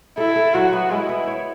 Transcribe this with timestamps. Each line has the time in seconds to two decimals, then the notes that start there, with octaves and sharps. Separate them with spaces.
0.18 E4 A4
0.36 A4
0.55 F#3 F#4
0.73 B3
0.91 G#3 E4
1.09 B3
1.27 C#5